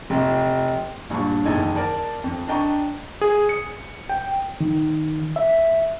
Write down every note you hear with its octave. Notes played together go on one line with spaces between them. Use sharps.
F1
A#1 G2 D4 C#6
F#1 E2 D#3 A4 D#5 G#6
A#4 D5 A5
F2
D4 D#5 G5 A#5 C#6
G#4
C#7
G5
D#3
E5